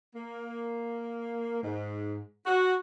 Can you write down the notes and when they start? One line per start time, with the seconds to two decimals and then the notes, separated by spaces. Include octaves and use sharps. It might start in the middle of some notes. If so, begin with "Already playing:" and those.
0.15 A#3
1.63 G#2
2.46 F#4